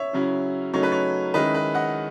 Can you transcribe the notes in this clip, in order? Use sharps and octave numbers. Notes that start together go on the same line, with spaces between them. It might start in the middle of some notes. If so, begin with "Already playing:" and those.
Already playing: C#5 E5
C#3 F#3 C#4 E4
C#3 F#3 A3 D#4 C#5
B4
C#5
D#3 G#3 C#4 E4 B4 D#5
B4
D#5 F#5